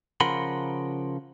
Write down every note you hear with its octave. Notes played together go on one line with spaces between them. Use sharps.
C#3 F3 A#4 F#5 B5 C6